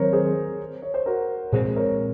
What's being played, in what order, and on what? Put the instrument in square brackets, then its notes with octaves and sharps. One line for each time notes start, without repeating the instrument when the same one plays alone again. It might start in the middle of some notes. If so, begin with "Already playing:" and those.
Already playing: [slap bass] D#3 F#3 C4 [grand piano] A#4 C5 C#5
[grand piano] G#4 C5
C#5
C5
F#4 A#4
[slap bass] A#2 G#3 C4 [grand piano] G#4 C5
[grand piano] A#4 C#5